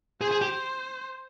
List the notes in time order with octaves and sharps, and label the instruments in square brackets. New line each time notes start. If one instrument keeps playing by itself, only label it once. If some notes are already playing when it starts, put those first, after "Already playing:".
[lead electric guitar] G#4 [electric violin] C5
[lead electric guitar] G#4
G4